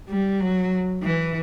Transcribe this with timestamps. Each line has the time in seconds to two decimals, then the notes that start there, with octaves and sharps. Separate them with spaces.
0.09 G3
0.40 F#3
1.03 E3